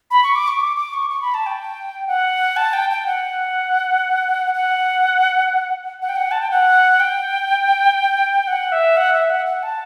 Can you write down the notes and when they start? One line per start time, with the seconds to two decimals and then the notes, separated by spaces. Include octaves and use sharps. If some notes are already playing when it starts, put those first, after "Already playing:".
0.11 B5
0.23 C#6
0.35 D6
0.48 C#6
0.60 D6
0.77 D6
0.93 C#6
1.10 C#6
1.22 B5
1.34 A5
1.46 G5
2.07 F#5
2.57 A5
2.73 G5
2.90 G5
3.06 F#5
4.54 F#5
6.02 F#5
6.09 G5
6.16 F#5
6.31 A5
6.41 G5
6.51 F#5
7.00 G5
8.47 F#5
8.72 E5
8.97 F#5
9.13 E5
9.30 F#5
9.46 F#5
9.63 A5